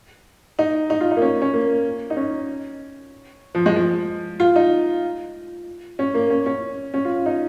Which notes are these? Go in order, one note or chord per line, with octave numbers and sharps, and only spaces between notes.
D#4
D#4
F4
D#4
A#3
C#4
C#4
A#3
D#4
C#4
F3
G#3
F3
F4
D#4
C#4
A#3
C#4
C#4
C#4
F4
F4
D#4